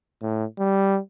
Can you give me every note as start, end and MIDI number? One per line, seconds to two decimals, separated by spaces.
0.22 0.45 45
0.59 0.99 55